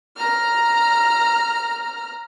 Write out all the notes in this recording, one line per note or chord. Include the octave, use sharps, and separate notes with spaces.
A#5 F6